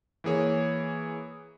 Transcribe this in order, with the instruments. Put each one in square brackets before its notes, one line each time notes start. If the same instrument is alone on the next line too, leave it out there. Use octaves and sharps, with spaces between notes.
[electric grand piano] E3 A#3 G#4 C#5